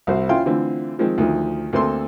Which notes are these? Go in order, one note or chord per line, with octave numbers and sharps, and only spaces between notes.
C2 F#4 C5
C#4 E4 F4 F5 G5 C6
D3 E3 A3 C4 F4
D#3 F3 G#3 C4
D2 D#3 F3
D2 A#3 C4 A4 C6